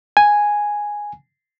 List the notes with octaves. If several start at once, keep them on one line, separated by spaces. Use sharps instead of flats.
G#5